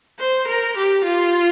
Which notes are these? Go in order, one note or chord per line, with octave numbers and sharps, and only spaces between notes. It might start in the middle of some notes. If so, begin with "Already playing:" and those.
C5
A#4
G4
F4